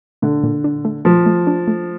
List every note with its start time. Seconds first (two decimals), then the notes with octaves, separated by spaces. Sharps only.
0.22 D3 A3
0.44 A#2
0.64 D4
0.85 A3
1.05 F3 A3
1.26 A3
1.47 D4
1.68 A3